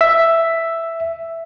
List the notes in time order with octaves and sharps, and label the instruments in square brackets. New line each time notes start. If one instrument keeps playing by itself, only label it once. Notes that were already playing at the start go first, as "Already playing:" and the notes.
[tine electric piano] E5